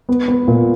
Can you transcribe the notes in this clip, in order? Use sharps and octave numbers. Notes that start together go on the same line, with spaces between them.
B3
B3
A#2